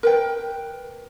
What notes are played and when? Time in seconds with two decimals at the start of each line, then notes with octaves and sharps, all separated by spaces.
0.03 A#4 B4 G5